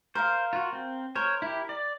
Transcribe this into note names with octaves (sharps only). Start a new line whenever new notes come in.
A#4 C5 F5
F4 F#4
C4
A#4 C5 C#5
E4 G4
D5